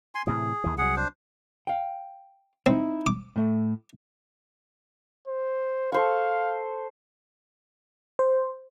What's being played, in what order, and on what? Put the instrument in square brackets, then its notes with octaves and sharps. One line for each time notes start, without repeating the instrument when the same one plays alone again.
[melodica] G#5 C6
[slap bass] A2 C3 E3 [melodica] G#4
[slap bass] D#2 E3
[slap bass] C2 F#3 [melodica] G#4 F#5
[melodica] D4 C5
[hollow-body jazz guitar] F5 G5
[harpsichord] C4 [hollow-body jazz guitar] D#4 E4
[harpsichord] D6
[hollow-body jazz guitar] A2 A3
[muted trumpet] C5
[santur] A4 C5 C#6 [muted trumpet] F5
[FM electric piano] C5